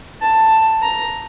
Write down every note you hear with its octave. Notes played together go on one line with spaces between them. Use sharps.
A5
A#5